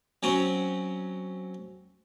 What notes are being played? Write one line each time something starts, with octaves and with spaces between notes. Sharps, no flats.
F#3 C4 C#4